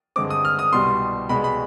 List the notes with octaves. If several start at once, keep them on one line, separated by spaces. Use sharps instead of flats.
G2 D3 G#3 C4 D6
D#6
F6
D#6
C2 B2 G3 C6
C2 B2 G#3 B5
B5